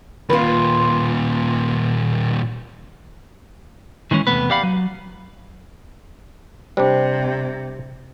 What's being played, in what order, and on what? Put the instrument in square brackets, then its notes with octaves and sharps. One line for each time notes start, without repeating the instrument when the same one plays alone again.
[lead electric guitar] D#2 A#2 [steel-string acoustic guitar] F4 B4
[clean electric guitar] D#3 E3 G#3 C#4
E2 C3 F3 A3 B3 B4
G4 D5 F5 F#5 B5
F#3
[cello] C3 [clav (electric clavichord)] G3 D4 [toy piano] C5